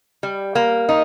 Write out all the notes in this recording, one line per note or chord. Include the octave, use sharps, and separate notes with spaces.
G3
A#3
D#4